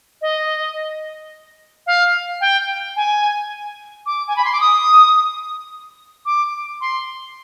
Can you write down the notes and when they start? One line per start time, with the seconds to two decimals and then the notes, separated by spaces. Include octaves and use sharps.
0.21 D#5
1.86 F5
2.40 G5
2.96 G#5
4.06 D6
4.27 G#5
4.36 B5
4.44 C6
4.52 D6
4.60 D#6
6.25 D6
6.80 C6